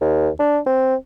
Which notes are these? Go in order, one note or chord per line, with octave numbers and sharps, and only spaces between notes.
D#2
D4
C4